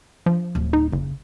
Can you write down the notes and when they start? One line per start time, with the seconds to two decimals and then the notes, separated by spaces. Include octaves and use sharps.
0.26 F3 D4
0.55 D1
0.73 D#4
0.92 F#1 C#3